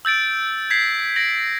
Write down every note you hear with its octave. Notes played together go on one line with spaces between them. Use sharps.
E6 G6 A6 D7
G#6 B6 C7 F#7
A#6 D7 F#7